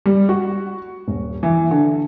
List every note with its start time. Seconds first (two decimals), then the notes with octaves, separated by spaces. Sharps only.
0.06 G3
0.29 F#4
1.08 D#1
1.43 E3
1.71 D3